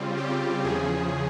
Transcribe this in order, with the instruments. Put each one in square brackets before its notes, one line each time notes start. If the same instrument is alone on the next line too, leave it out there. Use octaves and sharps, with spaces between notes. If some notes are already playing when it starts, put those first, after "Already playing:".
Already playing: [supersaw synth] C#3 G3 C4 F4
G4
E2 C#3 F3 G#4